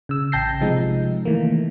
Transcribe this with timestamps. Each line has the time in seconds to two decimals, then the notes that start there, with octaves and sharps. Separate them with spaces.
0.09 C#3 E6
0.32 A1 G5 A5 G6 A#6 C7
0.61 C3 F3 G#3 D#4
1.25 D#3 E3 A3 A#3